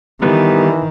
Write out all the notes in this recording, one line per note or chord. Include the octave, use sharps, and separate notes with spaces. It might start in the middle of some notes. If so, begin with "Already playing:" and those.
D#3 E3 G3 B3 B4